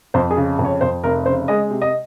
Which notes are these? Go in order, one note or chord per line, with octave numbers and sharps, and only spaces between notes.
F2 C5
G#4
C#3
F2
C#5
F2 C5
F1 A#4
C#3 C5
G#3 D#5
C3
D#5